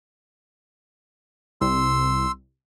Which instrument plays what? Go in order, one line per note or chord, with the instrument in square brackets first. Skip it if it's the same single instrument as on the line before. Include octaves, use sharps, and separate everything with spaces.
[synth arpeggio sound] C2 [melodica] C6 E6